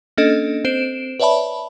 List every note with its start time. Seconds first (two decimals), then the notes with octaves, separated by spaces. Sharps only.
0.18 A#3 C#4 D4 A4 D#5
0.65 C4 C5 D7 E7
1.20 B4 C#5 D5 E5 A5 B5